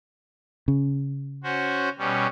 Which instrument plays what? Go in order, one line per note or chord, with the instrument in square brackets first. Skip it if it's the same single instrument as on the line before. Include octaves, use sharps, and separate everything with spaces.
[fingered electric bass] C#3
[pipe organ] C#4 F#4 C5
B2 G3 C#4